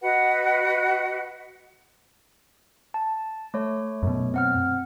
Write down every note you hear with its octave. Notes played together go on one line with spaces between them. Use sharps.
F#4 B4 D#5 F#5
A5
A3 C#5
F#2 B2
C4 F#5 F6